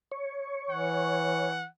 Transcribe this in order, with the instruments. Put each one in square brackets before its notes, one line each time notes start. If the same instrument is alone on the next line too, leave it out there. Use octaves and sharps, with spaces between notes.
[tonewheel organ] C#5
[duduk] E3 [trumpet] F#5